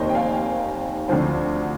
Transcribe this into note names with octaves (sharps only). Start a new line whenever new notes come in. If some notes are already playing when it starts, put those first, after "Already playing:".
Already playing: F1 D#2 D#3 A#3 C5 D#5
G5
F5 G#5
D2 D3 F3 C4